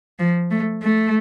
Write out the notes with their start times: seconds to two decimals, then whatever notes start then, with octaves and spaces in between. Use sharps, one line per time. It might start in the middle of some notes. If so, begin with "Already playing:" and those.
0.19 F3
0.51 A3
0.82 A3